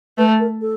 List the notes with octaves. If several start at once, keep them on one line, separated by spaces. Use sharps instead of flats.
A3 B4
A#4
A4